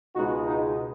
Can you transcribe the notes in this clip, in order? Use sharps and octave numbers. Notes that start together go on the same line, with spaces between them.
C#2 B2 G#3 B3 D#4 F#4
D#4